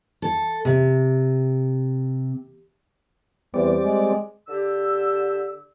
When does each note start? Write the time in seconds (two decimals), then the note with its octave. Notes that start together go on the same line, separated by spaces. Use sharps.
0.22 A4
0.65 C3
3.54 E2 G3 C4 D5
3.83 G#3
4.47 D3 G4 E6